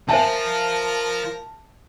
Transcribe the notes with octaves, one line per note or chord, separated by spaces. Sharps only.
F3 A#4 C5 E5 G#5 A5